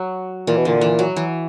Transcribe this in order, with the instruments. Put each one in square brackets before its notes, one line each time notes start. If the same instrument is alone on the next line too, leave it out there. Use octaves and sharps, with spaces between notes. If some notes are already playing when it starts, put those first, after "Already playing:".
Already playing: [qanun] F#3
[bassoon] A#2 [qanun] E3
[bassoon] B2
[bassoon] A#2 [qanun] D3
[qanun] E3
F#3
E3